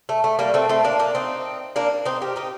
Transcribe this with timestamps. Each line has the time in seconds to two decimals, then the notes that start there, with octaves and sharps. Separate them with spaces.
0.09 A3
0.24 A3
0.39 G3 A#3
0.54 A3 C4
0.69 A3 C4
0.84 A#3 D4
0.99 A#3 D4
1.15 C4 D#4
1.76 A#3 D4
2.05 C4 D#4
2.22 G4 A#4
2.36 D#4 G4